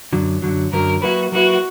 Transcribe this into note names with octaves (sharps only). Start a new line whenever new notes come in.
F#2 D3 F#3
F#2 D3 F#3
F#2 D3 F#3 A#4
F#3 A#3 E4 F#4 B4
F#3 A#3 E4 F#4 B4